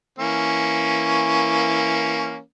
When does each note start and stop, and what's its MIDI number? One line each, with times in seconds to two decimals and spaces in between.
0.19 2.39 52
0.19 2.39 58
0.19 2.39 61